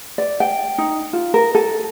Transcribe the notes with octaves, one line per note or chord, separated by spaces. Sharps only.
D5
G5
D#4
F4
A#4
A4